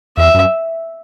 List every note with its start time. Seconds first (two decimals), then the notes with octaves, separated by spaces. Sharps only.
0.17 E2 E5
0.34 F#2